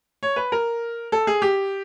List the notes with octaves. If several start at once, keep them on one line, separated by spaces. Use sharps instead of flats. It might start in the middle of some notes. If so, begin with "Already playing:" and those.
C#5
B4
A#4
A4
G#4
G4